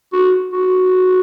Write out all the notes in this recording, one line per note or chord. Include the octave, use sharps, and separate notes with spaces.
F#4
F#4